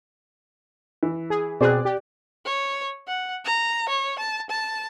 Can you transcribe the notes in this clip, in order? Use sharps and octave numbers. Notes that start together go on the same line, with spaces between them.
E3
G#4
B2 C4 G#4 D5 F#6
G4
C#5
F#5
A#5
C#5
A5
A5